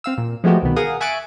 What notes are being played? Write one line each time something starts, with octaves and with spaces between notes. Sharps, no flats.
C4 F5 E6
A#2
F3 G#3 A3 B3 F#4 G4
C2 B2 D#3 B3
G#4 A#4 F5 F#5 D#6
E5 G#5 C#6 F#6 A6 D7